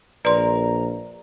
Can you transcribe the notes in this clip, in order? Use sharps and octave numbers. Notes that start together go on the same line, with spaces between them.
A#1 B4 D5 A#5 C6